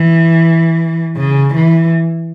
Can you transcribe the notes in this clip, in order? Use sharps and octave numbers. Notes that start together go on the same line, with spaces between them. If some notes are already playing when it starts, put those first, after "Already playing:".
Already playing: E3
C#3
E3